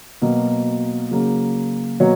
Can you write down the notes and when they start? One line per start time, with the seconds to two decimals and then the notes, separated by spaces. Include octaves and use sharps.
0.22 B2 F#3 A#3
1.11 C#3 F#3 A#3
2.00 B2 F#3 A#3 C#5